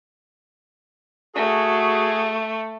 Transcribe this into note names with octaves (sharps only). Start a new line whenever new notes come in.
A3 F#4 G#4